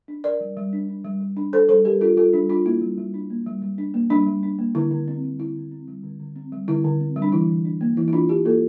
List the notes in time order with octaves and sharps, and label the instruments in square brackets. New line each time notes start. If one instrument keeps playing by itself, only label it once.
[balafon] D4
D4 A#4 D5
G3
G3
D4
D4
G3
G3
D4
D4 A4 C5
G3 A4 C5
G3 G4 A#4
D4 F4 A4
G3 F4 A4
G3 D4
D4 F4
A#3 E4
G3
G3
D4
A#3
G3
G3
D4
A#3
G3 D4
G3
D4
A#3
D3 E4
D3
C4
G3
D3 E4
D3
C4
G3
D3
D3
C4
G3
D3 E4
D3
C4
G3
D4
E3 E4
E3
D4
A#3
E3 E4
E4
E3 D4 F4
D4 E4 G4
A#3 F4 A4